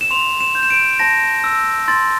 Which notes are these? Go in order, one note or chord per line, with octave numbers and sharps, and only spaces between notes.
E7
C6 F7
E7
G6
E7
D7
A5 A#6
E6
C6 A6